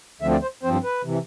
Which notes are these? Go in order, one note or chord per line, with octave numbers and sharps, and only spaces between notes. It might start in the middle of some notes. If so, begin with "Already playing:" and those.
D2 D3 F3 A3 C4 E5
D5
C5
G2 F3 C4 C5
B4
C3 E3